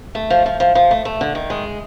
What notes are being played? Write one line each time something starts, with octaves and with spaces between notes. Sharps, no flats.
A3
F3
F3
F3
F3
A3
A3
D3
D#3
G#3